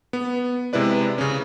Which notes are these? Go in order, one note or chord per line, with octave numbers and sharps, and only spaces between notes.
B3
C3 G#3 E4 B4 D5
C#3 C#4